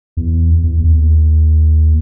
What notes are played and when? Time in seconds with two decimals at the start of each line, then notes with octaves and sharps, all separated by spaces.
0.17 E2
0.63 E2
0.80 D#2